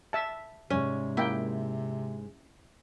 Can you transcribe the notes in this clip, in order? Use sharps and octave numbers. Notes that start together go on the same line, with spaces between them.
E5 A5
G#2 C3 G#3 C#4 D5
A#3 E4 G5